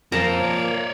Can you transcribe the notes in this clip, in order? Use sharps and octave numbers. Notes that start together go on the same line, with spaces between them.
F2 A#2 F3 A#3 C4 A5 A#5
C#5 D5